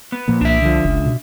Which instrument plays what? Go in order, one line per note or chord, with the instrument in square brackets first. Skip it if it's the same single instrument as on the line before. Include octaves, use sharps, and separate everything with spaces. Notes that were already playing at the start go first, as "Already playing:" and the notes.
[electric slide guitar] B3
[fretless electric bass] A#2 F3 A#3
[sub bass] C2 [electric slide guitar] D4 E5
[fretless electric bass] D3 F3
[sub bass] F#1 [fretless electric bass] C#2
[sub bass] B2